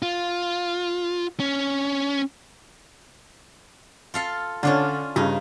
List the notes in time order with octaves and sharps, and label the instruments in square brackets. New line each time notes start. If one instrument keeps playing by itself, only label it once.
[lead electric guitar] F4
C#4
[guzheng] F4 A4 F5
[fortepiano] D3 C#5 [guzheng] C#4 D4 F4
[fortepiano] G2 C#3 [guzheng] D#4